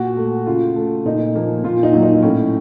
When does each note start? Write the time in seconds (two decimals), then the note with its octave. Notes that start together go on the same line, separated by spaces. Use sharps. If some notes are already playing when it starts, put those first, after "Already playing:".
Already playing: A#2 F#4
0.17 A3
0.46 C#3 F4
0.76 A3
1.05 A#2 D#4
1.35 F3 A#3
1.64 A#2 F4
1.83 D#4
1.93 F#3 A#3
2.03 D#4
2.22 A2 C#4